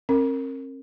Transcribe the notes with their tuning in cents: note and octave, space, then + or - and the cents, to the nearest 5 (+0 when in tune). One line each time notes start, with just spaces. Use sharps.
C4 +45 A#4 -15